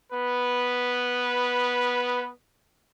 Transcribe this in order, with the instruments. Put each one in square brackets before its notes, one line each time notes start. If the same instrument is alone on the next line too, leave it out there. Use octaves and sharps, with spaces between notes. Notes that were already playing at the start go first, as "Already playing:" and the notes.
[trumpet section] B3 B4